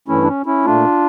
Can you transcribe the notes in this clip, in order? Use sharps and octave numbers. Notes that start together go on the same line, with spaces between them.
G2 E3 A3 C#4 E4
D4
C#4
C#4 E4
A#2 A3 D4 F4